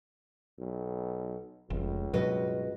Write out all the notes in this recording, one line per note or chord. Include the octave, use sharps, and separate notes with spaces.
B1
F1 C#2
G2 B2 F#3 F#4 B4 D#5